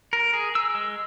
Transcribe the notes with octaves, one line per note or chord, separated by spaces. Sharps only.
A#4
G#4
E6
G#3